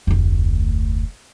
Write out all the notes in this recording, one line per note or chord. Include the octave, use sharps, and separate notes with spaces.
F1 D2